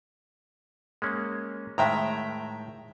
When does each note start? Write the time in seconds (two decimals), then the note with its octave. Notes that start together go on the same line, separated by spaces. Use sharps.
1.02 G#3 A#3 C#4
1.78 A2 D#3 G#3 E5 G5 A#5